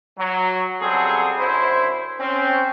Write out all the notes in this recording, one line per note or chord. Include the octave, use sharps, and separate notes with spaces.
F#3
C#3 F#3 G3 C4 G#4 A4
F#2 D3 E4 C5
C4 C#4